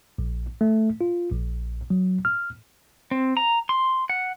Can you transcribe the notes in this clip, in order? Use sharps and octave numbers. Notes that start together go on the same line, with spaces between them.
A#1
A3
F4
A#1
F#3
F6
C4
A#5
C6
F#5